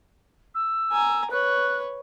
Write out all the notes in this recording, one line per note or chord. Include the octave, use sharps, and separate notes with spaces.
E6
G#5 A#5
B4 C#5 F#6